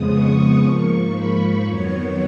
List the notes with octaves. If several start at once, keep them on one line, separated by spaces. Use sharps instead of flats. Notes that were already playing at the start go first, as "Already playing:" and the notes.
Already playing: F2 C#3 F3 G#3 B3 D#6
C#6
G#2 F3 A#3
B5
F2 D#3 F#3 B3 C#5